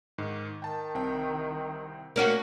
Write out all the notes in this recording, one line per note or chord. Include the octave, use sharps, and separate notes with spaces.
G#2 D#3
D#3 G5 A5
C2 C4 G5
A#3 C#4 F#4